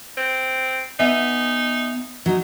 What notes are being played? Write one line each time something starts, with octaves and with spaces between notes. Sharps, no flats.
C4
B3 D#4 E5 G#5
F#3 D#4